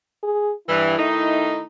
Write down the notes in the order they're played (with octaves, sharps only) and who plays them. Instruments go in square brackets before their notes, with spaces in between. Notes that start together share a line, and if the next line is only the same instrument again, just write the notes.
[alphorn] G#4
[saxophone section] G2 E3 [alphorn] E4
[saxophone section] D#3 A3 D#4